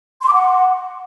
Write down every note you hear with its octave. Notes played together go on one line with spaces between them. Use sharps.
C6
D6
F#5